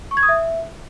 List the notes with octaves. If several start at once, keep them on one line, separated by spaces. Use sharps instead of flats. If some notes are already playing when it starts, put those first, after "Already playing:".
C#6
G#6
D#6
E5